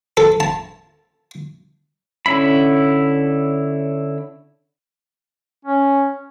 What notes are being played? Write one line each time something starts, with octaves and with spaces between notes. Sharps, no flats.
A4
A5
D3 C#4 E4 B5
C#4